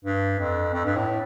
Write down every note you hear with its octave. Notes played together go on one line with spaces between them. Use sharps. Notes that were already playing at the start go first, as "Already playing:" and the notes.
G2
F2
F2
G2
A2